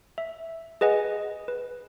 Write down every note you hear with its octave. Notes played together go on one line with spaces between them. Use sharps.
E5
G#4 B4 D#5 F#5 G#5
B4